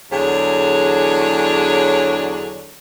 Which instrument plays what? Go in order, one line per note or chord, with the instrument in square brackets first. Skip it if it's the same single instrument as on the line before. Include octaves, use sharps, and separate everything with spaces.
[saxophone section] E2 D3 F#3 D4 G#4 C#5